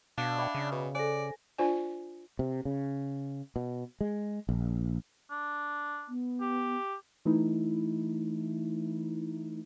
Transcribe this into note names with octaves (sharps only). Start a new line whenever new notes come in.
B2 D4 D5 F5 A5
D5 E5 G5 B5 D6
C#3
B2
A4 C5 D5 G#5 A#6
D4 F4 C5 D5 G#5
C3
C#3
B2
G#3
A#1
D4
B3
G4
E3 A3 D#4 E4